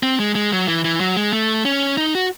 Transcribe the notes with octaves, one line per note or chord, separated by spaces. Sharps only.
C4
G#3
G#3
F#3
E3
E3
F#3
G#3
A3
C#4
D#4
F#4